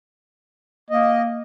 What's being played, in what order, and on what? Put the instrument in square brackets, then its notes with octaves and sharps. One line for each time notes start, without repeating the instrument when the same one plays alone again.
[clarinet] A#3 [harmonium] D#5